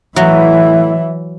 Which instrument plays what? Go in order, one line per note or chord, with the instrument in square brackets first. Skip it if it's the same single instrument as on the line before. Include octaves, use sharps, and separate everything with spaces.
[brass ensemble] A2 E4 [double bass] E3 [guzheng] F#3 [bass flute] E5